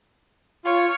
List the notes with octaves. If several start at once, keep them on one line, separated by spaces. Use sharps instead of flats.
F4 C#5